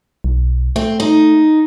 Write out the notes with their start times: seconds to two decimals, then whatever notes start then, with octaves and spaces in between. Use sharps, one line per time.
0.24 B1
0.76 A3 C4
1.00 D#4